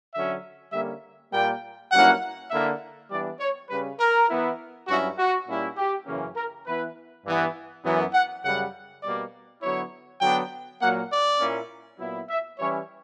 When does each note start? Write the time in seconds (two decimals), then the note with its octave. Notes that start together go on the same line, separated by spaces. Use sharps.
0.14 D3 F#3 C#4 E5
0.73 D3 G3 A#3 C#4 E5
1.32 A#2 G3 A#3 G5
1.92 G2 F#3 A#3 C#4 E4 F#5
2.51 D3 A#3 E4 E5
3.10 E3 G3 B3 D4 D5
3.40 C#5
3.70 C#3 G3 C#4 B4
3.99 A#4
4.28 E3 B3 E4
4.87 G2 F#3 C#4 E4 F#4
5.18 F#4
5.47 A#2 G3 C#4 E4
5.77 G4
6.06 F#2 C#3 E3 A#3 C#4
6.36 A#4
6.66 E3 B3 E4 B4
7.24 G2 E3 B3
7.84 F#2 E3 B3
8.14 F#5
8.44 F#2 C#3 G3 F#5
9.03 B2 G3 A#3 D5
9.62 D3 F#3 B3 E4 C#5
10.21 D3 F#3 B3 D4 G5
10.81 A#2 F#3 A#3 F#5
11.11 D5
11.40 A#2 A#3 C#4 E4
11.99 A#2 F#3 B3 E4
12.29 E5
12.58 E3 G3 C#4 E4 C#5